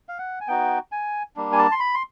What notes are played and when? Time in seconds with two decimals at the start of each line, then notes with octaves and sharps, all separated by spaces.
0.09 F5
0.18 F#5
0.41 G#5
0.48 B3 D#4 F#4 G5
0.92 G#5
1.36 G3 A#3 D4
1.52 G#5
1.58 A5
1.72 C6
1.80 B5
1.94 C6